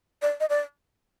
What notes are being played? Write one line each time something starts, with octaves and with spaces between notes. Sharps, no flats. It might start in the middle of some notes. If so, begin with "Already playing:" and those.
D5
D#5
D5